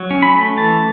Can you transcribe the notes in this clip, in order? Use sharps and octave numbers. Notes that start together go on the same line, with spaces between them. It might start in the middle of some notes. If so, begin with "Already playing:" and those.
Already playing: F#3
C#4
B5
A3
E3 A5